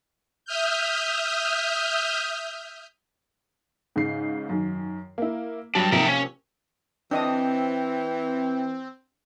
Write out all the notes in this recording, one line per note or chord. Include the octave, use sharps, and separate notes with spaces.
E5 D#6 F6 G6
G#2 C#3 C7
F#2 D#3
A#3 E4
F#3 G3 D4
C3 F3 A#3 D#4 E5 G5
C#4
E3 C4 D4 D#5 G5 D#6